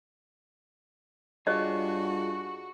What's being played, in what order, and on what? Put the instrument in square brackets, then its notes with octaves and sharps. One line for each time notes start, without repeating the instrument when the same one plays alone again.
[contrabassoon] G2 [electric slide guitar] D4 F4 G#4 [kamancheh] F#4 [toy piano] C#5 D#5